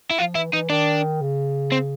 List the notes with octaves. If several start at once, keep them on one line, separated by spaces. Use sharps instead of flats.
E4
F3 F4
E3 E4
E3 D#4
D#3 D4
C#3
C4